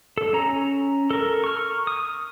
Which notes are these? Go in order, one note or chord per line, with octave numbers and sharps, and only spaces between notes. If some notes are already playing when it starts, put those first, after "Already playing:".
A4
C#4 A#5
A4 A#4
C#6 F6
D#6